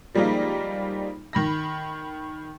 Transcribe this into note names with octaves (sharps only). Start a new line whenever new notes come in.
F3 G3 G#3 A#3 D#4 F4
D#3 B5 A#6